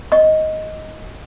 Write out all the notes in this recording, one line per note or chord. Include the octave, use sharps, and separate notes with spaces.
D#5 C#6